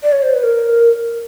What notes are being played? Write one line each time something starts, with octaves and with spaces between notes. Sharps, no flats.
D5
C#5
C5
B4
A#4